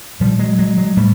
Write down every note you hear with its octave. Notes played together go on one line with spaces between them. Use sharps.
A#2 F3 G3
F#3 G#3
F#3 G#3
F#3 G#3
A2 G3 A3